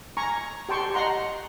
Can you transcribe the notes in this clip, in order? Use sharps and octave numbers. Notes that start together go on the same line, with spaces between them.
G#5 A#5 C#6
G4 G5 A5 C6 C#6
D#5 F#5 A#5 C6